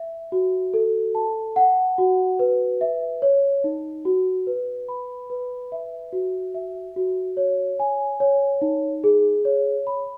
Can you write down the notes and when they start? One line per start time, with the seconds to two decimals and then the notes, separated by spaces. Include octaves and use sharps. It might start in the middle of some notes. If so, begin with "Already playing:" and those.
Already playing: E5
0.32 F#4
0.74 A4
1.15 A5
1.56 F#5
1.98 F#4
2.39 B4
2.81 E5
3.22 C#5
3.64 D#4
4.05 F#4
4.47 B4
4.88 B5
5.30 B4
5.72 E5
6.13 F#4
6.54 E5
6.96 F#4
7.37 C#5
7.79 G#5
8.20 C#5
8.62 D#4
9.04 G#4
9.45 C#5
9.87 B5